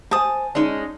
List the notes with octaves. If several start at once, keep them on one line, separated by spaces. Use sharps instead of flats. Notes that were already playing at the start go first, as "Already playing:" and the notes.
C5 G#5 A5 D#6
G#3 C#4 D#4 D5